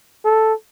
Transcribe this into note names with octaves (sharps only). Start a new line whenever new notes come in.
A4